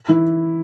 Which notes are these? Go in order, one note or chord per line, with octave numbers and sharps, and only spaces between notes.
E3 E4